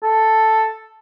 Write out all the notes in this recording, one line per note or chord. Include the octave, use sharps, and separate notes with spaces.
A4